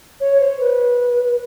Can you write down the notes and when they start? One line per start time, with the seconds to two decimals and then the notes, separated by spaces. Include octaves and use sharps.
0.20 C#5
0.40 C5
0.60 B4